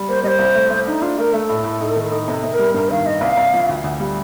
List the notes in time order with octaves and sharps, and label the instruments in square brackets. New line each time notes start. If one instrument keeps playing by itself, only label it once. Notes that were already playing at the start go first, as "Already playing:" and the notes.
Already playing: [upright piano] G3
[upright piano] A#3 [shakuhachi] C5
[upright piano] G3 [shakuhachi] D#5
[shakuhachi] C5
[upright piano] C2
A3
A3
[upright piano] D4 [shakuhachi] D#4
[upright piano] D4 [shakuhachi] F4
[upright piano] A3 [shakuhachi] A#4
[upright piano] A3 [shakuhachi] A4
[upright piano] A2
A2
D#4
D#3
D#4
[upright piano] C3 [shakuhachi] A4
[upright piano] C3
[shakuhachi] A#4
[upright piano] G3
[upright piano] G2 [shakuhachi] A#4
[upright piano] D#3 [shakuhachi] F5
[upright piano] D#3 [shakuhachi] D#5
[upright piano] C2 [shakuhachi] F5
[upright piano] C2
F3
D2
D2
G3